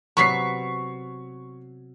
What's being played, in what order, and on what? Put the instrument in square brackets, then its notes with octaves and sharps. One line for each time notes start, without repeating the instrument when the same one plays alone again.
[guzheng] C3 F#3 B3 [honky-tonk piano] C#6 B6 C7